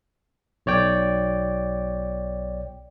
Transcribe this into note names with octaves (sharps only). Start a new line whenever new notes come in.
B1 C#5 D5 G5